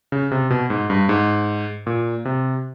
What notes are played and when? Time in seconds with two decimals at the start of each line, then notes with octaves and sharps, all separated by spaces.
0.12 C#3
0.31 C3
0.50 B2
0.70 G#2
0.90 G2
1.09 G#2
1.87 A#2
2.25 C3